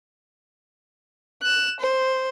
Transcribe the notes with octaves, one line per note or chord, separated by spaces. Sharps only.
F#6 E7
C5